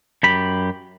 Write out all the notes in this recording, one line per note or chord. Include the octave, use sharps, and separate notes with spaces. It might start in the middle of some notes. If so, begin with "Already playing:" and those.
F#2 G4 B5